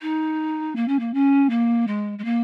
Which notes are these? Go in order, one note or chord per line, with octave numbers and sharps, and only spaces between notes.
D#4
A#3
C#4
A#3
C#4
A#3
G#3
G#3
A#3